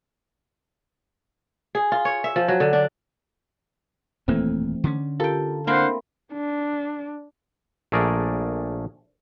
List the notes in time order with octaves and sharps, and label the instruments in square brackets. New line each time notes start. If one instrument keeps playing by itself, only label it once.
[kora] G#4
F4
C#5
E5
F3
F#3
D3
D4
[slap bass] D#1 F2 A#3 [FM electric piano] E3 A3 C4
[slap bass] D3 C#4
[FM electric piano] F4 G4 A#4 [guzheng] A4 G5
[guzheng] A#3 C4 E4 [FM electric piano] D4 [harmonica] C5 F5 F#5
[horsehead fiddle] D4
[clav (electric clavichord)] A#1 A3 G#4 A#4 D5